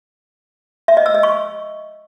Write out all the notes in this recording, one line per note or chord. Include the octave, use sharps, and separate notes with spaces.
E5
D#5
E6
D#5
C#6